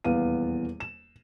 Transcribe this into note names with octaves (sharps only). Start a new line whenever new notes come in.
D#1 E2 B3 F5 D#7
E7